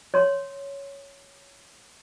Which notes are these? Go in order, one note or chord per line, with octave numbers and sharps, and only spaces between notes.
C#5 C6